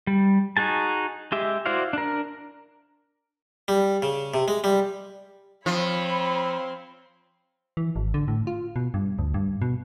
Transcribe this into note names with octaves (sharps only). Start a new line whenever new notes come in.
G3
D#4 F#4 G#4 A5
G#3 G4 E5
E4 F#4 C5 D5 F5
D4 A#4
G3
C#3
C3
G#3
G3
F3 C4 C#5 B5
E3
G#1
D3
A2
F4
B2
G2
D2
G2
B2